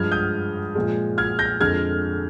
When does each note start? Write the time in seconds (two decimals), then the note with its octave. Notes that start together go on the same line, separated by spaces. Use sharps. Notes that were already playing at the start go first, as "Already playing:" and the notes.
Already playing: G2 F3 G#3 F6 G#6
0.12 D#6 G6
0.75 A#2 F3 G#3
1.18 F6 G#6
1.39 G6 A#6
1.60 F2 D3 G#3 F6 G#6